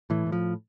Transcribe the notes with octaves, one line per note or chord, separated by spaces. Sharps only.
A2 E3
A2
F3